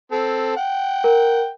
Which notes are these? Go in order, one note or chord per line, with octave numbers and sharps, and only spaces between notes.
C4 A4
F#5 G5
A#4